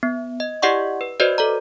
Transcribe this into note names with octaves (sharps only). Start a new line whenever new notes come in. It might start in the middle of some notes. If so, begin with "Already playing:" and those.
B3
D#5
E4 G4 D5 D#5 F#5 C#6
B4
F#4 B4 C5 D5 D#5
A4 D5 A#5